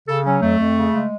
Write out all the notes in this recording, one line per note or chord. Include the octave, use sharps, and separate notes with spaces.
C#3 A4
F#3 C#4
F2 A3
F2
C#3
G#3